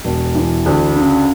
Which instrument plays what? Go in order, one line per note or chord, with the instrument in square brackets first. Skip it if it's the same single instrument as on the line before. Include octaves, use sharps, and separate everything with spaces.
[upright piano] E1
E3
D2
C#3